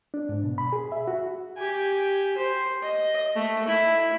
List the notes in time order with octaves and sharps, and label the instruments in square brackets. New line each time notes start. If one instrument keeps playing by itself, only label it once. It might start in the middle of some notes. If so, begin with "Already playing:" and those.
[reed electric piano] D4
G#2
B2
B5
G#4
E5
F#4
[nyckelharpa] G4 G#5
C5
D#5
A3
E4